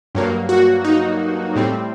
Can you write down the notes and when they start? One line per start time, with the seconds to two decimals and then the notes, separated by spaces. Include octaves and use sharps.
0.15 G2 F#3 A#3
0.49 F#4
0.85 D#4
1.56 A2 G3 C4